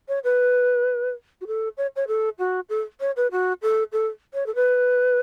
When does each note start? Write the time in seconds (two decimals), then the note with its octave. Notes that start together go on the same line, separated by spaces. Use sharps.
0.08 C#5
0.24 B4
1.41 F#4
1.47 A4
1.77 C#5
1.96 C#5
2.08 A4
2.39 F#4
2.69 A4
3.00 C#5
3.17 B4
3.32 F#4
3.62 A4
3.92 A4
4.34 C#5
4.46 A4
4.55 B4